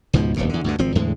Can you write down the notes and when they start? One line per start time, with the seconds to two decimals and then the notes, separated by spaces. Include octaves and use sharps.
0.13 C#2 G#2 B2 F3
0.36 D#1 G#1 D#2 C#3
0.49 E2 D3
0.64 D2 G2 D3
0.79 G#1 F3 C4
0.95 E2 A2 D3 G#3